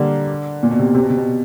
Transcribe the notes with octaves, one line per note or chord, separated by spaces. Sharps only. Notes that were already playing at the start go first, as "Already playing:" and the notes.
Already playing: D3 G3 A#3
A#2
B2
C3
B2
C3
B2
C3
B2